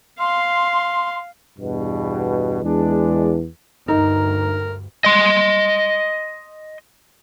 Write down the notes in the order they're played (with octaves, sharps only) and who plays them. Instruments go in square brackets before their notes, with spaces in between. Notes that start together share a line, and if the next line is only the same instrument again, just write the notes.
[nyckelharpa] F5 [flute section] C6
[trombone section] E2 G2 B2
[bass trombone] E2 [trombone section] G#3 D4
[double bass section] D2 G2 [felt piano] D#4 [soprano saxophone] A#4
[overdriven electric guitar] D#5 C6